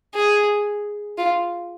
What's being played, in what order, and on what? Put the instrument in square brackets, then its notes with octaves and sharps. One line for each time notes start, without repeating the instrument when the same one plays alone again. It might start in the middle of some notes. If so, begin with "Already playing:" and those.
[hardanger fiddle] G#4
F4